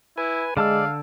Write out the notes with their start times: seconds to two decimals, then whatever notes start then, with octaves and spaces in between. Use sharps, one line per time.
0.18 E4 B4 G#5
0.57 D3 G#3 D5 F5 A5 E6